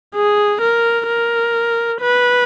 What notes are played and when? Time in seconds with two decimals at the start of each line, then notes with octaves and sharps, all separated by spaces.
0.15 G#4
0.62 A#4
1.08 A#4
2.02 B4